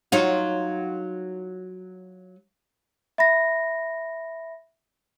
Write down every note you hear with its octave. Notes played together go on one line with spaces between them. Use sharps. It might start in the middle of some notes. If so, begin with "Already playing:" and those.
F#3 D#4 F4
E5 B5 A#6